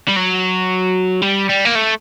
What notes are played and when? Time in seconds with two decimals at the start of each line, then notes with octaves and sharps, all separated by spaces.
0.08 G3
0.17 F#3
1.22 G3
1.49 G3
1.65 A#3
1.75 A3